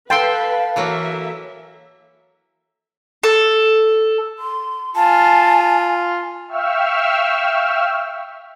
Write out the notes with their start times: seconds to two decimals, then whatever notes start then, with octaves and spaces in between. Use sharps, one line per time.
0.10 A4 B4 E5 F5 G5 C6
0.76 E3 F#3 A#3 A4 E5
3.23 A4
4.39 C6
4.95 F4 G#5 A5
6.48 E5 F5 G5 C#6 E6 F6